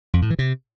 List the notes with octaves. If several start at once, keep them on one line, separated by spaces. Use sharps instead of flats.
F2
A2
E3
C3